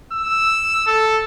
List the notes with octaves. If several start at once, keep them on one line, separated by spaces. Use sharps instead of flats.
E6
A4